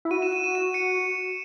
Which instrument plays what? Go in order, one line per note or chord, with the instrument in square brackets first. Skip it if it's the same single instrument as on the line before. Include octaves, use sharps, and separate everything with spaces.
[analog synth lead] E4
[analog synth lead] F#4 [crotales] D#7
[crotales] E7
D#7
E7
D#7
C#7